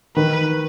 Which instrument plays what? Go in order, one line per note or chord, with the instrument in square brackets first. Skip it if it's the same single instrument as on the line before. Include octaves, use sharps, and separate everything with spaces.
[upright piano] D#3 [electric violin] B4